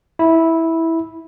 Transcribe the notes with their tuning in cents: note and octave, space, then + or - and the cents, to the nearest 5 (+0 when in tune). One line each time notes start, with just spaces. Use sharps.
E4 -10